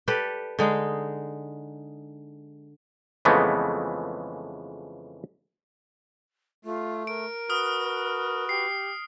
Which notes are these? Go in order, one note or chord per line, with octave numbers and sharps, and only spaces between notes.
G4 A4 B4 D5
D3 G#3 D#4
F2 C#3 E3 G#3 A3 B3
A3 F4
A#4 D7
F#4 B4 D#6 F6
G4 C7